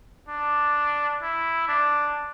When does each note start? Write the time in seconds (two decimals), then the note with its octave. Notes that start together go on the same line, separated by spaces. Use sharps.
0.28 D4
1.22 E4
1.68 D4